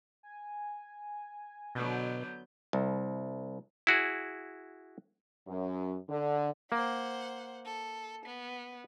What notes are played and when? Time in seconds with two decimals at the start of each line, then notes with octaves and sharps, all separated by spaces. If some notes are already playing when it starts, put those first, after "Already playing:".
0.23 G#5
1.75 B2 D3 F#3 B3 G6
2.73 C2
3.87 E4 F#4 G#4
5.47 F#2
6.09 D3
6.72 A#3 C5 F#5
7.66 A4
8.26 B3